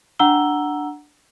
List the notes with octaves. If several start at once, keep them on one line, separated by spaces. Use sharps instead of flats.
D4 F#5 A#5 E6 G7